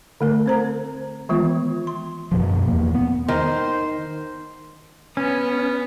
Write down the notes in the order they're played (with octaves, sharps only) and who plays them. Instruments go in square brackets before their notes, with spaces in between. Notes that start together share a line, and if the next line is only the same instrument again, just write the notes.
[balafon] D3 A3 A#4
C4 C5 A#5
D#3 E3 G#3 B3 F4
C6
[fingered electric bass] F#2 B2 F3
E2 A#3
B3
[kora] D#3 [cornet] C5
[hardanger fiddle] B3 [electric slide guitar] C#4